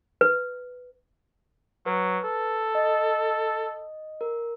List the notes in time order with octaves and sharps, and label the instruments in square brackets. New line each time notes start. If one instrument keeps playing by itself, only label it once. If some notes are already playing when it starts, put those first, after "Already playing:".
[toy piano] B4
[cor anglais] F#3 [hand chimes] B4
[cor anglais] A4
[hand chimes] D#5
A#4